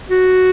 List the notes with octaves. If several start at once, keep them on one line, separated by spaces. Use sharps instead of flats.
F#4